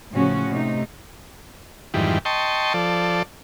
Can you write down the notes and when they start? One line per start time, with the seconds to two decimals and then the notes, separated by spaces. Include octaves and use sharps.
0.12 A2 C#3 F3 C#4 F#4
0.50 C3 A3 D#4
1.94 F2 G#2 D#3 E3 G3
2.25 D#5 G5 A5 C6 C#6
2.74 F3 A4 D5